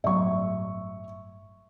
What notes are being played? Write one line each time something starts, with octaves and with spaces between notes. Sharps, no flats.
G1 A2 F#3 E5 C#6